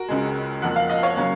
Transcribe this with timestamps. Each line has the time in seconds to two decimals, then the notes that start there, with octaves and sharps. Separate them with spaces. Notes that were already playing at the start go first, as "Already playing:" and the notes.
Already playing: F#4 A#4
0.08 C#2 C#3 G#3
0.62 F2 F3 A#3 F#5
0.76 F5
0.89 D#5
1.03 C#5 F5
1.17 C#3 F#3 A#3 C#4